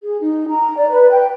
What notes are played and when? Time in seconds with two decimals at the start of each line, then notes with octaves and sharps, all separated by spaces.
0.03 G#4
0.21 D#4
0.49 A#5
0.76 D5
0.89 B4
1.11 G5